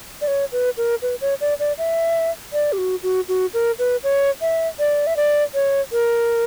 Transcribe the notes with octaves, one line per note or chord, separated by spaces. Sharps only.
D5
C#5
B4
A#4
B4
C#5
D5
D5
E5
D5
G4
F#4
F#4
F#4
A#4
B4
C#5
E5
D5
E5
D5
C#5
A#4